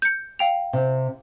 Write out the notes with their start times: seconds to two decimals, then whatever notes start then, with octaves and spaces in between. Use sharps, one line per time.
0.02 G6 C#7
0.39 F5 G5 F7
0.73 C3